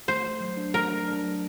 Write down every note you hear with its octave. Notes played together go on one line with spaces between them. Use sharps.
A3 C5
A3
F#3
D4
A3 A#4
D4
D4
F#3